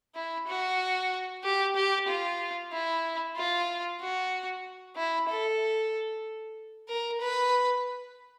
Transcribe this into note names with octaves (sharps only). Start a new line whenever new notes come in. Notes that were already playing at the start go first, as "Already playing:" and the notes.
E4
F#4
G4
G4
F4
E4
F4
F#4
E4
A4
A#4
B4